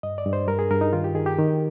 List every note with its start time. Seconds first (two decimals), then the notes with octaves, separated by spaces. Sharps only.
0.03 G2 D#5
0.18 D5
0.25 G2
0.33 C5
0.48 G2 A#4
0.59 G#4
0.71 G2 A#4
0.81 D#4
0.93 D#3 F4
1.04 G4
1.15 D#3 G#4
1.26 G4
1.38 D#3